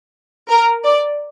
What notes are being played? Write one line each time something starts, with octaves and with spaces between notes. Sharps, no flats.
A#4
D5